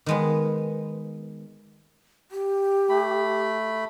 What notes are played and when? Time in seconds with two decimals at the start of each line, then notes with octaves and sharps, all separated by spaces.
0.06 D#3 G#3 B3
2.31 G4
2.90 A3 B5